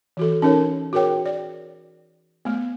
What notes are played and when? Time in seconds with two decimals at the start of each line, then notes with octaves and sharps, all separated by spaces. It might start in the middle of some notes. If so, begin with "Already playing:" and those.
0.17 E3 F#4 A4
0.42 C#4 D#4 A#4 C#5
0.93 F#4 G#4 A#4 C#5 G5
1.26 D5
2.45 A3 B3